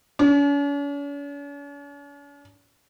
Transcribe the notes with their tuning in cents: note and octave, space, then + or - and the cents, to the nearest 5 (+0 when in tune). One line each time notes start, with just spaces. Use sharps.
C#4 +45